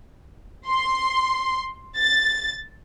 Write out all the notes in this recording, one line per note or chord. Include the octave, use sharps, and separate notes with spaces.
C6
A6